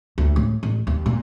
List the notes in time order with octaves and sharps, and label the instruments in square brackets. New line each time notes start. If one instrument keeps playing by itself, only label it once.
[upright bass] D2
A2
A1
D#2
A#2